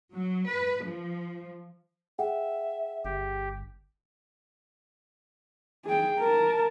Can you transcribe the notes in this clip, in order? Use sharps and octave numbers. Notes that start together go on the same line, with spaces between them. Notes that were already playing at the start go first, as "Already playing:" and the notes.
F#3
B4
F3
G#4 E5 F#5 G5
G1 G4
G#4 G5
A#4 A5